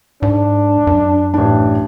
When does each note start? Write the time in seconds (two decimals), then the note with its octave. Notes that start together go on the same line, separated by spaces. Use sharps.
0.22 G#2 D4
0.87 F#2
1.34 A1 D4